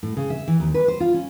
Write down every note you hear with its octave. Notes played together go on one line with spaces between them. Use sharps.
A2
C#3
E5
E3
D#2
B4
C5
F4
C#4